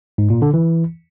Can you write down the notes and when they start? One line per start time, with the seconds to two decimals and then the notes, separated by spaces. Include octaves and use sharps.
0.18 G#2
0.30 A#2
0.42 D3
0.54 E3